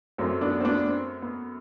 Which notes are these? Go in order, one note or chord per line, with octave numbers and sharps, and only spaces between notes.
F#2 F#3 A3 C4
B3 D4
C4
B3 D4
C4
B3